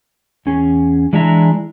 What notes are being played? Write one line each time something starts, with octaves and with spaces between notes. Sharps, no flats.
E2 C#4 G#4
E3 G#3 D4 E4 E5 A#5